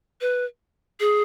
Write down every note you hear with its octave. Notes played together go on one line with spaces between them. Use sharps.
B4
G#4